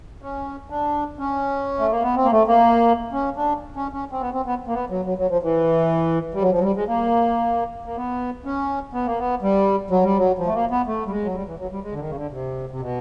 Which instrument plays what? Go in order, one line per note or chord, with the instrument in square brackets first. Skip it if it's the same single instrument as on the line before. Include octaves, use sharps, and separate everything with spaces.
[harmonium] C#4
D4
C#4
A3
A#3
B3
C4
A#3
A3
A#3
C#4
D4
C#4
C#4
C4
B3
C4
B3
A#3
B3
F#3
F#3
F#3
F3
E3
G3
F#3
F3
F#3
G3
G#3
A#3
A#3
B3
C#4
B3
A#3
B3
G3
F#3
G3
F#3
F3
A3
A#3
B3
A3
G3
G#3
F#3
G3
E3
F#3
G3
G#3
D3
D#3
C#3
D3
C3
C3
B2